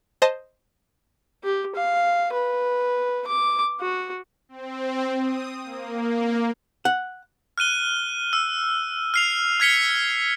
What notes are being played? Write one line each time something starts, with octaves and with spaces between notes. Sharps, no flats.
C5 D#5 A5 D#6
G4
F5
B4
D6
F#4
C4
D#6
A#3
F#5
F6 F#6 D#7 G7
E6
F6 C7 F7
F6 G#6 B6 C#7 G7